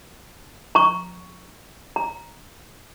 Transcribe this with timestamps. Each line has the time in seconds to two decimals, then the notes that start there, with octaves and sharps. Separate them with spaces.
0.75 A#5 C#6
1.96 A#5